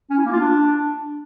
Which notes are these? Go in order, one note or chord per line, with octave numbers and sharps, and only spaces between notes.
C#4
E4
A#3
F4
D4